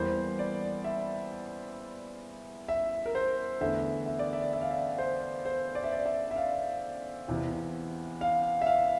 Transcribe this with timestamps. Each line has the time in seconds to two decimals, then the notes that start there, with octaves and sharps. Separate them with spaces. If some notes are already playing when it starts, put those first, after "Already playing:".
Already playing: E2 E3 G3 A#3 C5
0.39 D5
0.84 E5
2.68 E5
3.06 A#4
3.15 C5
3.61 E2 D3 A3 E5
4.06 E5
4.19 D5
4.33 E5
4.53 E5
4.61 F5
4.71 E5
4.98 C5
5.45 C5
5.75 D5
5.84 E5
5.92 D5
6.06 E5
6.31 E5
6.36 F5
7.28 E2 C3 E3
8.21 F5
8.61 E5
8.66 F5